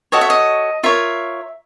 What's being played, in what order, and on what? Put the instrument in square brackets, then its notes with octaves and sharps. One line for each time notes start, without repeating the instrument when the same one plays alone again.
[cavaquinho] F#4 A4 C#5 D#5
E5
D#5
F4 A#4 C#5 E5